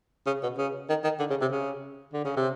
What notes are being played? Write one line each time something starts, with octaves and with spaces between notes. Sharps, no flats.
C#3
B2
C#3
D#3
D#3
D3
C#3
C3
C#3
D3
C#3
C3